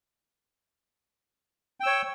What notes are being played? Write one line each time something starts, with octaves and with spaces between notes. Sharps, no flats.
C#5 G5 E6